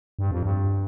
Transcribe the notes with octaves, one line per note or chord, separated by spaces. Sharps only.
G2
F2
G2